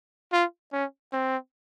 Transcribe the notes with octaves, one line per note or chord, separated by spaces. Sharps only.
F4
C#4
C4